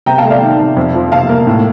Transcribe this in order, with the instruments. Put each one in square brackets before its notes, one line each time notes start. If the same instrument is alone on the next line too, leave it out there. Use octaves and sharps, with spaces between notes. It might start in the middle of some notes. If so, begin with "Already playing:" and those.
[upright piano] C3 G5 A#5
F5 A5
A3
D5 F5
D#3
C3
F2
F3
C3 F5 A5
A#3
A2